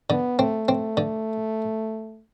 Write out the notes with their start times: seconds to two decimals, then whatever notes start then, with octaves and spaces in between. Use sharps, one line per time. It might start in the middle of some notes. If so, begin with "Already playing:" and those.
0.10 D3 B3
0.39 A3 C4
0.68 C4
0.97 D3